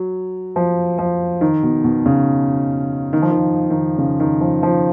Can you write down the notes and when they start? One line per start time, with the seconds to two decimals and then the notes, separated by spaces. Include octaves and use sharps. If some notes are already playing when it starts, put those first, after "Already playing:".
Already playing: F#3
0.56 F3
0.99 F3
1.41 D#3
1.63 B2
1.84 B2
2.06 C#3
3.13 D#3
3.22 F3
3.31 D#3
3.70 D#3
3.98 C#3
4.20 D#3
4.41 F3
4.63 F3